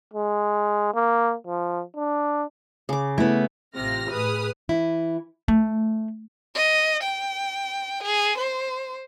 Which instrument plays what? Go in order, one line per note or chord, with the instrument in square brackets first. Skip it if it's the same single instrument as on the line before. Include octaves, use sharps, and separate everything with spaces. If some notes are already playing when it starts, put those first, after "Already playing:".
[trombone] G#3
A#3
F3
D4
[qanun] C#3 D6
[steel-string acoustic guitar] A3 B3 [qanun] E4
[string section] A1 C3 F4 F6 A#6
A2 G#4 B4 D#6 F6
[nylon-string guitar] E3 E4
[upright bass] A3
[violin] D#5
G5
G#4
C5